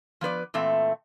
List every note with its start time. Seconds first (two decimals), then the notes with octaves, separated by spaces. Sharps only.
0.21 F3 B3 B4 D5
0.54 A#2 E3 A3 C4 E5